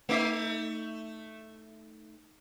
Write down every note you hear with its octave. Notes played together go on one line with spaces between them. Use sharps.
A3 D#4 E5